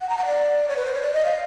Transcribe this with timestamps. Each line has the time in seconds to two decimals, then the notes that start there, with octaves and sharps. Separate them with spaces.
0.01 F#5
0.09 A#5
0.18 F#5
0.26 D5
0.68 C#5
0.76 B4
0.85 C5
0.94 C#5
1.02 D5
1.14 D#5
1.25 F5